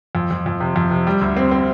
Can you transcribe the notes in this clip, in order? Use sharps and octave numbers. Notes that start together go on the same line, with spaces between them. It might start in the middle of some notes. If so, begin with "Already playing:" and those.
F2
F2
F2
C3
F2
C3
G3
D2
C4
C4